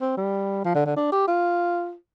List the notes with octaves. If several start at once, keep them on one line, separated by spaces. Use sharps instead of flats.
C4
G3
F3
D3
D3
D4
G4
F4